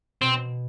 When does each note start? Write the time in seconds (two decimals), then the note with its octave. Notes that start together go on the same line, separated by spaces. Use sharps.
0.22 B2 C4